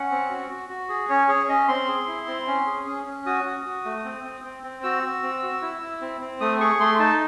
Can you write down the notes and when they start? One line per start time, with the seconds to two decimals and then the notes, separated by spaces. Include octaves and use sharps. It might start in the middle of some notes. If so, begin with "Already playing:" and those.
Already playing: C#4 F#5
0.11 C4
0.30 F#4
0.50 F#4
0.69 F#4
0.89 G#4
1.10 C#4 C#5
1.29 G#4 C#5
1.49 C#4 D#5
1.68 C4 C6
1.88 G#4
2.08 E4
2.27 C4
2.47 C#4
2.67 G#4
2.86 C#4
3.06 C#4
3.26 F#4 D#6
3.45 F#4
3.65 F#4
3.85 A3
4.04 C4
4.24 C4
4.44 C4
4.63 C4
4.83 F#4 E6
5.03 F#4
5.23 C4
5.43 F#4
5.62 E4
5.82 E4
6.01 C4
6.21 C4
6.41 A3 D#6
6.60 G#4 C#6
6.80 A3 C6
7.00 D#4 A5